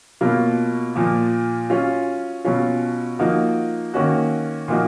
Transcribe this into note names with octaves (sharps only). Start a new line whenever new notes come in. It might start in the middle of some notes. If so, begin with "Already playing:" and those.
B2 F#3 A#3 F4
A#2 F3 A#3
F#3 C#4 F4
B2 F#3 C#4 F4
F3 A#3 D#4 F#4
D#3 A#3 C#4 F#4
A#2 F3 A#3 D#4 F#4